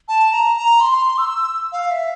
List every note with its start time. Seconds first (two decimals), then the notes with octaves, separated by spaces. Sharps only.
0.08 A5
0.32 A#5
0.57 A#5
0.80 C6
1.18 E6
1.72 F5
1.91 E5